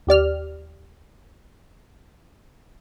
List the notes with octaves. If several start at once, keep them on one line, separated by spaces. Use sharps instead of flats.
D#2 G4 D5 F6